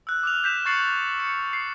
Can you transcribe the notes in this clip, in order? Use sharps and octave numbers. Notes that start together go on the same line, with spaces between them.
E6 F#6
D6 F6 F7
G6 B6 E7
C#6 F#6 A6 C7 C#7 F#7
C#7
C7